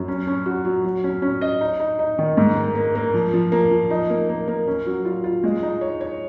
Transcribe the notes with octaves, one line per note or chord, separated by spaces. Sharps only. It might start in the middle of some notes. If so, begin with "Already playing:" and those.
Already playing: F#2
C#4
C#4
F#4
F#3
F#3
C#4
C#4
D#5
D#4
D#4
D#4
D#3
G#2
A#3
A#3
A#3
F3
F3
A#3
F3
D#4
A#3
A#3
A#3
C#4
F#3
F4
F4
G#3
D#4
C#5
C#5